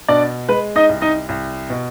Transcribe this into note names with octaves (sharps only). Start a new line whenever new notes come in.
B2 D4 D5
G#3 B4
D#4 D#5
C2
D#4 D#5
C2
B2